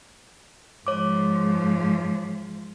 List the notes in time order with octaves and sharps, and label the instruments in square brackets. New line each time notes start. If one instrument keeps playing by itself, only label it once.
[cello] G#2 F3 [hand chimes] C#5 D6